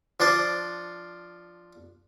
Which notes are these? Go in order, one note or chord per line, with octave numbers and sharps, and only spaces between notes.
F3 D4 C5 D5